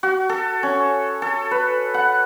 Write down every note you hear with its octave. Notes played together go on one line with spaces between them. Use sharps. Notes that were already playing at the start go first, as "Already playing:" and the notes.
F#4
A4
C#4
A4
B4
F#5